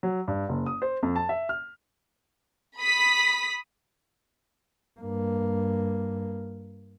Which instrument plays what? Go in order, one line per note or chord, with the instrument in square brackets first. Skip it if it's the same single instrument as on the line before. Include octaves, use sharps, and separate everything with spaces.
[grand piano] F#3
G2
F#1
D#6
C5
F2
A5
E5
F6
[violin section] B5 D#6 B6
[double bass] G2 A#3